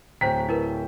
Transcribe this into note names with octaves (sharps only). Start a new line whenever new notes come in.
D1 C5 G5 A#5 B6
E4 A#4 B4